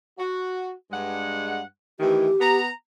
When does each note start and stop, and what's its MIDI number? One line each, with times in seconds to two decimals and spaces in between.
0.18 0.71 66
0.91 1.61 43
0.91 1.61 56
0.91 1.61 78
2.00 2.28 45
2.00 2.28 51
2.00 2.28 52
2.00 2.59 67
2.40 2.69 59
2.40 2.69 82